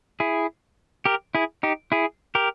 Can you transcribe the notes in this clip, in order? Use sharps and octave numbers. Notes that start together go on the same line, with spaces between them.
E4 G#4
G4 A#4
E4 G#4
D#4 G4
E4 G#4
G4 A#4